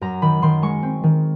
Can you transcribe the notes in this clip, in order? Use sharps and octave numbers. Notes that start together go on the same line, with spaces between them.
F#2 A#5
D#3 B5
D#3 C6
G#3 C#6
C4
D#3